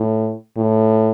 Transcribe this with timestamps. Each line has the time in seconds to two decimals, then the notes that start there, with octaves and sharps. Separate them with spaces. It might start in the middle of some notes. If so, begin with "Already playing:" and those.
Already playing: A2
0.57 A2